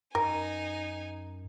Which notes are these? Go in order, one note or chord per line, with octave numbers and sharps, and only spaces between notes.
F#2 D#4 A#4 G#5